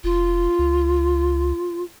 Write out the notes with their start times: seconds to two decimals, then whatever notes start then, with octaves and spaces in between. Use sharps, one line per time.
0.04 F1 F4
0.59 C#2